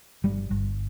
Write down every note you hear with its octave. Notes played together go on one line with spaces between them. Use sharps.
G1 G3
G1